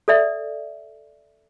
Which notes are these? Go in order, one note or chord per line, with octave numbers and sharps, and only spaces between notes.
A4 D5 E5